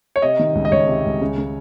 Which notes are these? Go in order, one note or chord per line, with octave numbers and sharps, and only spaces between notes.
C#5
C3 D#5
D#3
C#2
D#5
C#2 C#5
C3
C#2
C#3
C#3